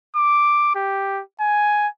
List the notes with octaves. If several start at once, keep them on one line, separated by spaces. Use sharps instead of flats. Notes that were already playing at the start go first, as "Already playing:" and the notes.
D6
G4
G#5